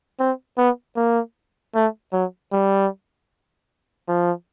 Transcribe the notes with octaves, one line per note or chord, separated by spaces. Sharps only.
C4
B3
A#3
A3
F#3
G3
F3